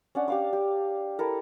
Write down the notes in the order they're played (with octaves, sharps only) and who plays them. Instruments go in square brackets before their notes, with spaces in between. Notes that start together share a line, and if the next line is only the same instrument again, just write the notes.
[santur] C#4 D4 F#5
G4 F5 D6
G4
E4 A4 A#4